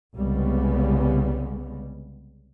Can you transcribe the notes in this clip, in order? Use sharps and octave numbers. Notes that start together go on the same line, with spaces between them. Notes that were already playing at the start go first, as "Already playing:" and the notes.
C2 C#3 G3 G#3 B3